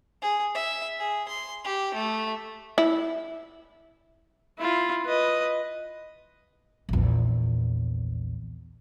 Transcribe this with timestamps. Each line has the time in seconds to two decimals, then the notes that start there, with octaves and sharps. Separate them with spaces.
0.22 G#4
0.54 E5
0.99 G#4
1.28 C6
1.64 G4
1.94 A3
2.78 E4
4.58 E4 F4
5.06 B4 D#5
6.89 A#1 E2